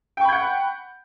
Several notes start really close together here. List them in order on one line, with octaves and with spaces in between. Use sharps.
G5 C#6 B5 G6 F#5